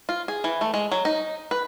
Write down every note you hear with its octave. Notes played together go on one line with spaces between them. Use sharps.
F4
G#4
E3
A3
G#3
F#3
D#4
B4